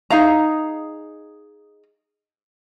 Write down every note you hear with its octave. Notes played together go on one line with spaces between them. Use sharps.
D#4 G#4 F5 A#5